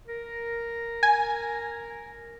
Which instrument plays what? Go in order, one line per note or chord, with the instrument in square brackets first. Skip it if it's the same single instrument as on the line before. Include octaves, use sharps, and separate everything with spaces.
[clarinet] A#4
[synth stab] G#5